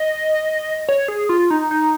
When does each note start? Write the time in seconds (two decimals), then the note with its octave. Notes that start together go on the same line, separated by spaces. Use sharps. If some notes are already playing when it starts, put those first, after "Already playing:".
Already playing: D#5
0.89 C#5
1.08 G#4
1.29 F4
1.51 D#4
1.71 D#4